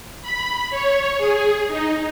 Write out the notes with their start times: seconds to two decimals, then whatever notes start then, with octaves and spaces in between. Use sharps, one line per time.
0.22 B5
0.70 C#5
1.18 G#4
1.68 D#4